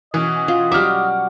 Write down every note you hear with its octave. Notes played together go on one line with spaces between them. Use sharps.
B2 E3 C#4 D#5
F4
F#3 G3 F#4 E5 D6 F6